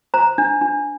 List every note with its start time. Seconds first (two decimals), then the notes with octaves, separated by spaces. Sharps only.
0.14 C5 A#5
0.38 D4
0.61 D4